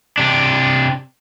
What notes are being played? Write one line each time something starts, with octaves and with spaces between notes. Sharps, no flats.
C3 D4